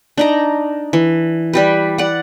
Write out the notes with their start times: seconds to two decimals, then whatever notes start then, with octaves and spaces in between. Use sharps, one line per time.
0.18 D4 D#4 A#5
0.93 E3
1.53 G3 G4 B4
1.98 D5 F#5